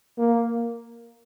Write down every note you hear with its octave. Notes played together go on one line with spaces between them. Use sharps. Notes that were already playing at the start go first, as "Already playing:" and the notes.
A#3